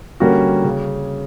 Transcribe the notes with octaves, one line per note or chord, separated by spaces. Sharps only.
D3 G3 A#3 C#4 F#4
C#3